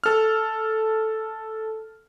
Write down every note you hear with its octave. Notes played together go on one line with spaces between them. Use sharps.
A4 F6